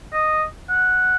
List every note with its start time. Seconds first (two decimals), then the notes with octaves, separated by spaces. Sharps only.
0.13 D#5
0.70 F#5